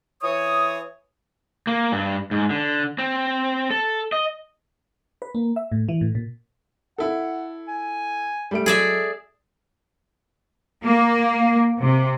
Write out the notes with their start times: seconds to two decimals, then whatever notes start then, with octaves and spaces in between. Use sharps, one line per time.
0.22 E3 C#5 D#6
1.67 A#3
1.92 G2
2.31 G#2
2.50 D3
2.98 C4
3.71 A4
4.12 D#5
5.22 B4
5.35 A#3
5.56 E5
5.72 A2
5.89 E3
6.01 A2
6.15 A#2
6.98 E4 A4 F#5
7.68 G#5
8.51 G3 A3 D7
8.66 F#3 G#4 A4 D5 E5
10.83 A#3
11.81 C3